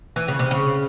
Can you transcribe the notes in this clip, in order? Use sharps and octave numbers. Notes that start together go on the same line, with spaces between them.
E3
C#3
C3
C#3